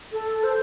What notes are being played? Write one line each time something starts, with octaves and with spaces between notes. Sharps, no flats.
A4
C5